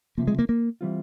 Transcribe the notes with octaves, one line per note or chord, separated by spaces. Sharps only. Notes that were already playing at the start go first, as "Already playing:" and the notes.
C#2 C3 F3 A#3
G#3
A#3
A#3
E3 G3 C4 F4